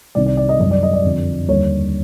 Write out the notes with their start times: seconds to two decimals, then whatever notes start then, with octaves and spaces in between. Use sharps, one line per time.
0.15 C2 C3 D#3 D5
0.26 D5
0.37 D5
0.49 D#5
0.59 F#2 D#3 G3 D#5
0.71 D5
0.83 D#5
0.93 D5
1.04 F2 D3 F3
1.48 D#2 D3 G3 C#5